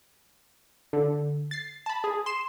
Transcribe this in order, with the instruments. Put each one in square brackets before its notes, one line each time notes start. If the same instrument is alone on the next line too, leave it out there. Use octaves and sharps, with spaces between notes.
[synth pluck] D3
A6 C7
A5 B5
G#4
C6 E7